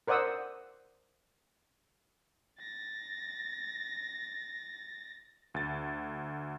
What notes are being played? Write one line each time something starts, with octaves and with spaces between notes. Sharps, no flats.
A#4 C5 D5 F#5 D#6 E6
A6 A#6
D2 A6